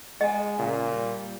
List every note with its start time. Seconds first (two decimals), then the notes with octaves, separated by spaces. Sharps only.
0.21 G#3 D#5 F#5 G#5
0.59 A#2 C#3
0.92 G3